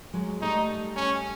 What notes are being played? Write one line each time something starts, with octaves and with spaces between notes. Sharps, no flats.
F#3 G#3
G3 A3 D#4
C#4